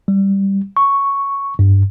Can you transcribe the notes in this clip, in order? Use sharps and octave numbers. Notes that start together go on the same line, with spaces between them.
G3
C#6
G2